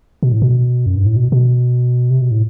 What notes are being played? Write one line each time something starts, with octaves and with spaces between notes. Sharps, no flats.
B2
A2
B2
F#2
G2
A2
B2
B2
C3
B2
A2